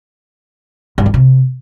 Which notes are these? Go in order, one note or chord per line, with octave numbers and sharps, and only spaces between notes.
G2
E3
C3